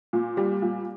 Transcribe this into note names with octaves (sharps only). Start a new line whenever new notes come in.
A#2
G3
A#2